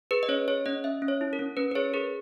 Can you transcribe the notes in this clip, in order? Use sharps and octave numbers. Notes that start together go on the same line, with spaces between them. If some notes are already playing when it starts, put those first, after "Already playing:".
G#4 B4
D#5
C#4 C#5
G#4 C#5
C#4 D#5
C#4 E5
C#4
C#5
E4
A#4
C#4
C#4 B4
B4
G#4 C#5
G#4 A#4